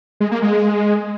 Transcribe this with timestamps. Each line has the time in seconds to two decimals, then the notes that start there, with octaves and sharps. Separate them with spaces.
0.20 G#3
0.31 A#3
0.42 G#3